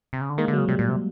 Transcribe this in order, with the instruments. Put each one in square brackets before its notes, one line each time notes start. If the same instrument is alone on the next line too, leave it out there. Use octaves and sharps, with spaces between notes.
[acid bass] C3
C#3
D3
[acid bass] D#3 [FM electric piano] G#3 A#3
[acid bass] D3
[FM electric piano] F#3
[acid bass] C#3
[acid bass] C3 [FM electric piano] G3
[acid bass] A#2
C3